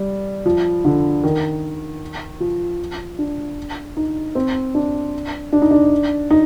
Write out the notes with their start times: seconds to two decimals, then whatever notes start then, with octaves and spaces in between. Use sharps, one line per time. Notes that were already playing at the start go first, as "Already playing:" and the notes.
Already playing: G3
0.46 F3
0.85 D3
1.23 D#3
2.40 F3
3.19 D4
3.97 D#4
4.35 C4
4.75 D4
5.53 D4
5.62 D#4
5.71 D4
6.31 D#4